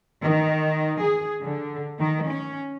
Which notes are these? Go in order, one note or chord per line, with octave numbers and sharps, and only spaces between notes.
D#3
G#4
D3
D#3
C#4